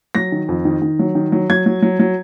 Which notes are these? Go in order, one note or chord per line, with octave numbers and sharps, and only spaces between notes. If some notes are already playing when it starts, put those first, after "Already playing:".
F#3 A#6
D#3
F2
D#3
D#3
F#3
D#3
F#3
F#3 G#6
F#3
F#3
F#3